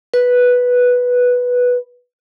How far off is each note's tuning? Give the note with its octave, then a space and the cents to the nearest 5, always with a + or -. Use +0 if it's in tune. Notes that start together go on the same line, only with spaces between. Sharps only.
B4 -5